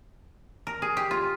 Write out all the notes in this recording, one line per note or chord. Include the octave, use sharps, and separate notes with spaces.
A#4
G#4
G4
F4